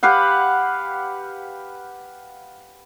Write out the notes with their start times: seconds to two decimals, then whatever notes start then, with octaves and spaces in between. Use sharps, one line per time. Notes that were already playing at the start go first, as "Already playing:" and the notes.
0.03 G4 B4 F5 F#5